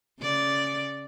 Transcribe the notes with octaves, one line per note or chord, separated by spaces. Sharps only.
C#3 D5